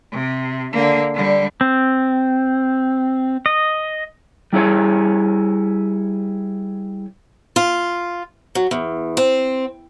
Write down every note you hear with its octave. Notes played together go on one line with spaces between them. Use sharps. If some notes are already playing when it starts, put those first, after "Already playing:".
C3
D3 A#3
D3 G3
C4
D#5
G3 E4 G#4 C#5
F4
F#3
E2
C4